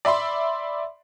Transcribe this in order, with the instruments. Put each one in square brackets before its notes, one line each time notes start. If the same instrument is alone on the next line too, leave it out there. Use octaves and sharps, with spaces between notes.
[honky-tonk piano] D5 E5 B5 C6